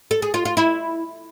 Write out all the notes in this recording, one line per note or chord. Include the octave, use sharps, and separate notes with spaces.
A4
G#4
F4
F4
E4